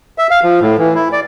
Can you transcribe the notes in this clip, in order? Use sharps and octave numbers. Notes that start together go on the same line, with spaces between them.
E5
F5
F3
A2
E3
E4
D5